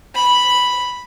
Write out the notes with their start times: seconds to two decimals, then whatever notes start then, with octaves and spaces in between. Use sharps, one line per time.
0.14 B5